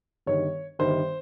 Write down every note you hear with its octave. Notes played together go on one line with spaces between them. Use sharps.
G1 G2 D#3 C#5
G1 G2 D#3 C5